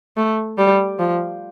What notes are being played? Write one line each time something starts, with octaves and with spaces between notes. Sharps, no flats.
A3
G3
F3